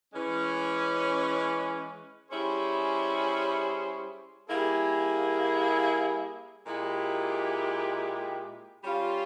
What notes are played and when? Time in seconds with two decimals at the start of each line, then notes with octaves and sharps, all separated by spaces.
0.13 E3 G#3 C#4
2.30 G3 C#4 E4 G#4 C5
4.48 G3 A#3 E4 G#4
6.65 A#2 G#3 E4 G4
8.83 G3 C#4 F4